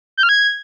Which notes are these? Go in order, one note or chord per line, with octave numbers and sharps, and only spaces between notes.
G6
F6
G#6